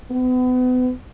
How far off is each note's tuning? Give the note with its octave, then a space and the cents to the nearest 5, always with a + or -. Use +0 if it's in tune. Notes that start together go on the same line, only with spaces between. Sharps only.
B3 +35